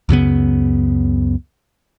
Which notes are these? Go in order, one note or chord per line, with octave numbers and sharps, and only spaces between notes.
C#2 F#2 C#3 B3